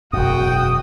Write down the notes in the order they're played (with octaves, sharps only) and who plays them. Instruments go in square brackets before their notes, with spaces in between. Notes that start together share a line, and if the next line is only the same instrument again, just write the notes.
[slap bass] E1 F#2 [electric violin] F#4 G5 [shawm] D#6